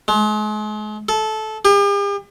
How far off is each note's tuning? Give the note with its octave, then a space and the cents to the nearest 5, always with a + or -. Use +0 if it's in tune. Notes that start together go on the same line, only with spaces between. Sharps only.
G#3 +40
A4 -15
G4 +45